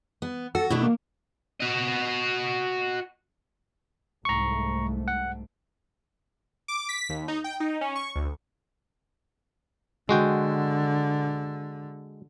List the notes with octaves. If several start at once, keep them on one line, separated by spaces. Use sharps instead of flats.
B3
F#4 A4
B2 A3 D4 E4
A#3
F#4 D#5
C2 G#2 A3 A#5 C#6
F#5
D6
B6
D#2
D#4
G5
D#4
C#4
C#6
D2
D3 G#3 F#4 G5